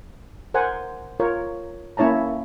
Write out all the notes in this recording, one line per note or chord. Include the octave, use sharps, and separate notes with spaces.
A#4 C5 F#5 G#5
F4 A#4 C#5
A#3 C#4 E4 C#5 A5 A#5